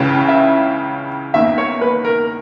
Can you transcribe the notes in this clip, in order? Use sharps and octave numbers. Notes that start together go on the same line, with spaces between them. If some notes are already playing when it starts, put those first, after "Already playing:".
Already playing: C#2 C#3 E3
E5
E2 D#3 A#3 E5
C#5
B4
A#4